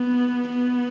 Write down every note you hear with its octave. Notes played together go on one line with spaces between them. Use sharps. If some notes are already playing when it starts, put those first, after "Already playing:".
Already playing: B3
B3